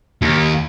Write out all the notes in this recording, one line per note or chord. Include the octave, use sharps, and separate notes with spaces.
D#2